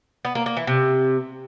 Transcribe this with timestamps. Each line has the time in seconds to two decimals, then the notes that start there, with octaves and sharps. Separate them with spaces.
0.25 B3
0.35 A#3
0.46 A#3
0.57 E3
0.67 C3